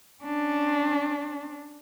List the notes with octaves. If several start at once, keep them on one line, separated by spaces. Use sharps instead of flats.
C#4 D4